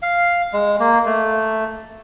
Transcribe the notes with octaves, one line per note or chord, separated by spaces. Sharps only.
F5
G#3
A#3
A3